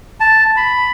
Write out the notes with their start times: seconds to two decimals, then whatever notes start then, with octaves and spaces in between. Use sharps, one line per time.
0.20 A5
0.57 B5